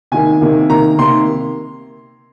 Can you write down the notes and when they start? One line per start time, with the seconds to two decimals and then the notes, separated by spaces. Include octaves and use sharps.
0.12 C3 D#3 A#3 G#5
0.41 C3 D#3 A#3
0.69 C3 D#3 A#3 A#5
0.98 C3 D#3 A#3 C6